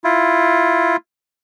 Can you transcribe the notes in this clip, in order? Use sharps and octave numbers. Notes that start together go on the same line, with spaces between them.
E4 F4